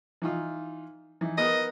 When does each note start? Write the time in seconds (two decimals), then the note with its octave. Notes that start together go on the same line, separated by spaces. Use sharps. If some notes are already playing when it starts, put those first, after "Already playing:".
0.22 E3 D#4 F4
1.21 E3 D#4
1.38 B3 A#4 D#5 D#6